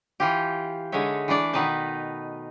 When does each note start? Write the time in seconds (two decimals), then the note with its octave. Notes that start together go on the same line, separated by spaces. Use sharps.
0.20 E3 F4 G4
0.92 D3 G#3 D#4 C#5 E5
1.28 E3 A3 D4 D5
1.53 B2 D#3 D#4 B4 A5